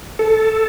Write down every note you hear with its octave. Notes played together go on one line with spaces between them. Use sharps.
A4